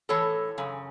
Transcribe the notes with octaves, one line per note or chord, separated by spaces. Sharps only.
A2 E3 A4 C#5
F#2 C#3